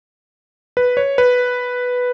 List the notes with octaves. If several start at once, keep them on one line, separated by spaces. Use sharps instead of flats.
B4
C#5
B4